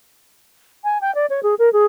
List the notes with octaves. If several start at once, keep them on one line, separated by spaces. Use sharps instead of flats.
G#5
G5
D5
C#5
G#4
A#4
G#4